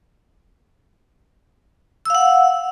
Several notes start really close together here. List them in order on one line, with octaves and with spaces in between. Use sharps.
E6 F5 F#5